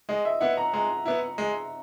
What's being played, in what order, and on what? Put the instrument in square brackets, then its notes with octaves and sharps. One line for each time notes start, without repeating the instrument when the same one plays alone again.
[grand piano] G#3 [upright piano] D#5
[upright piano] E5
[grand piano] B3 E4 [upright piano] F#5
[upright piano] A#5
[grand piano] G#3 [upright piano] A#5
[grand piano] B3 E4
G#3